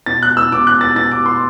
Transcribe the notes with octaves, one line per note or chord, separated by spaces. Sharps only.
B2 A6
F#6
E6
B2 D6
F#6
A6
B2 A6
D6
C6